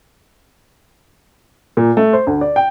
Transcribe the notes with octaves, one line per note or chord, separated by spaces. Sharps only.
A#2
A3
C5
D2
D5
G5